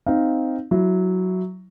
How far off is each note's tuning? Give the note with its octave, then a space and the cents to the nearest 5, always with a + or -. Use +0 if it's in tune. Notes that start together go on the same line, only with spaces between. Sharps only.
C4 +0 D#4 +0 F5 +0
F#3 +0 E4 +0